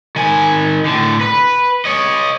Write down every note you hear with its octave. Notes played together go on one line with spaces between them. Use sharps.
D#3 G#5
A2 D3
B4
C#5 D#5